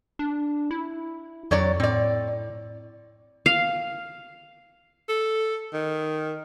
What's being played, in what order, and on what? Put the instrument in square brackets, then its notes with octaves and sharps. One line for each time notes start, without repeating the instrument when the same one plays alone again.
[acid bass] D4
E4
[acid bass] F2 [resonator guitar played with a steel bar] F#3 C#5 D5
[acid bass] A2 [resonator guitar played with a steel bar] C4 D5
[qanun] F5
[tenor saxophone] A4
D#3